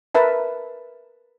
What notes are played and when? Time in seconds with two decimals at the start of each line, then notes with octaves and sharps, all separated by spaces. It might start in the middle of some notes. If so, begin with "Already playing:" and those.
0.15 A#4 B4 E5 A5